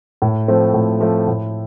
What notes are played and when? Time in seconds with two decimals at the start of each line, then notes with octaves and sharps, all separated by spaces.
0.22 A2
0.48 F3 A3 C4
0.74 A2
1.00 F3 A3 C4
1.27 A2